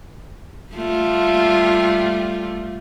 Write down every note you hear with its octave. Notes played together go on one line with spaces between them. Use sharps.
G3 A3 F4